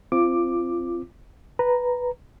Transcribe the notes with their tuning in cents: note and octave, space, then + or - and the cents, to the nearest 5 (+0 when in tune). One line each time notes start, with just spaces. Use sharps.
C4 +0 F4 -25 D6 +5
B4 +0 A#5 +0